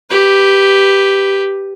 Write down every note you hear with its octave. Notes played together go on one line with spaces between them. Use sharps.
G4 B4